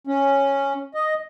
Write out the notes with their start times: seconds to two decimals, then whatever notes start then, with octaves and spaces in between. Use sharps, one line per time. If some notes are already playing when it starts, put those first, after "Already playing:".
0.07 C#4
0.94 D#5